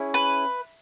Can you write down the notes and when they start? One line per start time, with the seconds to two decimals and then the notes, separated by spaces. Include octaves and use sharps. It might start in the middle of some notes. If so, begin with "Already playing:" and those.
Already playing: C#4 E4 G#4
0.14 B4